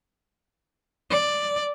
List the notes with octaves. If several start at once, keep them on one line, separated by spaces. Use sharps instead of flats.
D5